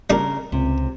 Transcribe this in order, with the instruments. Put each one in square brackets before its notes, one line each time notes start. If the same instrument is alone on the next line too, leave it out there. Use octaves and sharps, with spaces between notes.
[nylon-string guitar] C#3 A#4 [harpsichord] G3 D4 D5
[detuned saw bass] C#2 [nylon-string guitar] C3